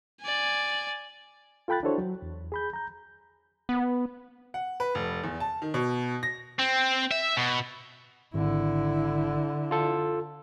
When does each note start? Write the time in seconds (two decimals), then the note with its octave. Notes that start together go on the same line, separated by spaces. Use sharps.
0.21 D5 G#5
1.68 F4 A4 G5 B5 F#6 A6
1.83 D4 E4 F#4 A4 C5 C#5
1.98 F#3
2.22 E2
2.52 G#4 B5 G6
2.73 A#5 G6
3.69 B3
4.54 F#5
4.80 B4
4.95 F1
5.23 E2
5.40 A5
5.62 D#3
5.74 B2
6.23 A#6
6.59 C4
7.11 E5
7.37 B2
8.34 G#1 D3 E4
9.71 F4 A4